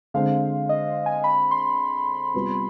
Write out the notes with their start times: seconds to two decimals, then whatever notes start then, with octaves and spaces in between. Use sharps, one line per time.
0.14 D3 G#3 C4 F5
0.69 D#5
1.06 G#5
1.24 B5
1.51 C6
2.34 C3 G3 B3 F4 B4